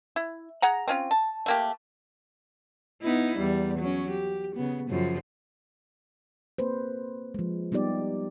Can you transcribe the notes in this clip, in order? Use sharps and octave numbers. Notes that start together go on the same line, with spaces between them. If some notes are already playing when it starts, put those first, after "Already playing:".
E4
G#4 F#5 A#5
C4 C#4 F4
A5
A3 A#3 G4
B3 D#4 E4
E2 G3
F#3 C#4
G4
C#3 B3
F#2 C#3 F3
A#3 C4 B4 C5
F3 G#3
G3 B3 D#4 G4 D5